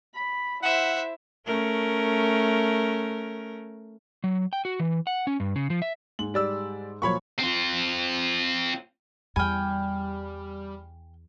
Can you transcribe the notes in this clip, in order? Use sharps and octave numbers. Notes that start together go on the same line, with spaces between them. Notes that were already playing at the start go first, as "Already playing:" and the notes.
B5
E4 C5 E5 F#5
A3 C#4 A#4
F#3
G5
F#4
E3
F#5
C#4
G2
C#3
F3
E5
G#2 F#7
G3 D5 E6
A#2 F3 F#3 C#5 B5 C#6
C4 F4
E2 G3 G5 G#5 B5 F6